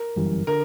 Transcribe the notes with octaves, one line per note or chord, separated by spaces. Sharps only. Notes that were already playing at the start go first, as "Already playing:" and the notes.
Already playing: A#4
G1 F#2 E3 G3
D3 A#4